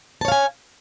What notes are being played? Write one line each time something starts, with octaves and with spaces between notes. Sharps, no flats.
C#5 F5 G#5 A5